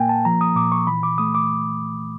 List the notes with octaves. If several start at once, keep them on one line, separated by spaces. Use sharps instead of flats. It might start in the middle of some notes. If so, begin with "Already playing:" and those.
Already playing: A#2 A#3 G5 G#5
A5
F3 A#5
D#6
A#2 D6
C#6
E3 B5
D6
A3 D#6
D6